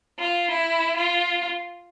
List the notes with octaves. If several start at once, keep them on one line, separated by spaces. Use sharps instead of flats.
F4
E4
F4